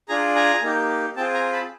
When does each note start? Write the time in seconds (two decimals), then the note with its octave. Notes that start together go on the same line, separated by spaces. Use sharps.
0.09 D4 F4 G#4 G#5 A#5
0.36 G#5 A#5
0.62 A#3 D#4 G4
1.16 C4 F4 G#4 G5 A5
1.34 G#5 A#5
1.53 A5 B5